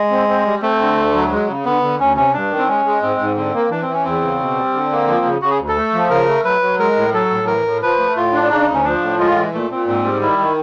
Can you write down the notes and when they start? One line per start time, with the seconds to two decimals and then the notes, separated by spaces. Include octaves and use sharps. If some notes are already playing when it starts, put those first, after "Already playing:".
Already playing: G#3
0.11 C4
0.28 C4
0.46 G3
0.62 A3 C4
0.79 D3
0.96 D2
1.13 F#3
1.31 G#3
1.48 C#3
1.65 D3 B3
1.83 D3
2.00 D2 C#4
2.16 C3 C#4
2.33 G2 D4
2.51 D#3
2.58 C4
2.68 G#3 C#4
2.85 G#3
3.02 G#2 C4
3.20 G#2
3.37 D3 C4
3.54 A#3
3.70 E3 D4
3.82 C4
3.88 E3
3.94 C#4
4.05 E2 C4
4.22 C#3
4.39 B2
4.56 G3
4.74 D3
4.91 A#3
5.08 F3
5.25 C#3
5.42 C#3 F#4
5.50 G#4
5.59 D2
5.68 A4
5.77 A3
5.94 F3
6.10 C#3 A#4
6.28 A3
6.45 F#3 B4
6.62 F#3
6.79 G#3 A#4
6.96 A2
7.13 F#3 A4
7.30 A2
7.47 E3 A#4
7.65 A2
7.82 F3 B4
7.99 A3
8.16 A2 F4
8.33 D4
8.50 C#3 D#4
8.68 D2
8.74 C#4
8.84 F3 D4
9.01 A2
9.19 G#3 F4
9.36 E3
9.53 A#2 A3
9.71 A#2 C4
9.87 G#2 C4
10.05 G3
10.22 D#3 E4
10.39 D#3